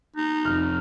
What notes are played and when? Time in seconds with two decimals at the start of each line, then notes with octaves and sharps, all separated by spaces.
0.17 D#4
0.45 F1 F2 F6